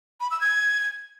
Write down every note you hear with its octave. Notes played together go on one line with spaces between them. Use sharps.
B5
E6
G#6